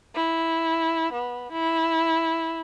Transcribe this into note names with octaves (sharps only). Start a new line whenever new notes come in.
E4
B3
E4